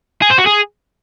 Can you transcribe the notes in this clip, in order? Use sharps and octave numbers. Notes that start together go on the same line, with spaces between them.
G#4
C5
F#4
G#4